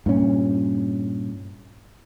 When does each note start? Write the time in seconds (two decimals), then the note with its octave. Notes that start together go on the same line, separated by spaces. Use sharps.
0.06 G2 A#2 C#4